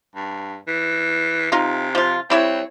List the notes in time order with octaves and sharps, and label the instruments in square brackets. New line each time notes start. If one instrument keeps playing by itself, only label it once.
[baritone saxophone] G2
E3
[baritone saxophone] C3 [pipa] D#4 F4
[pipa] F3 F4
[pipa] G3 E4 C#5 [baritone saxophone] C4